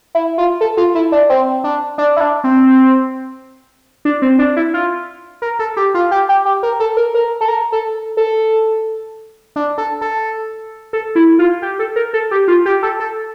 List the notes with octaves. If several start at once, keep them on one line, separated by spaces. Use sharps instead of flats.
E4
F4
A4
F4
E4
D4
C4
D4
D4
E4
D4
C4
D4
C4
D4
E4
F4
A#4
A4
G4
F4
G4
G4
G4
A#4
A4
A#4
A#4
A4
A#4
A4
A4
D4
A4
A4
A4
E4
F4
G4
A4
A#4
A4
G4
F4
G4
A4
A4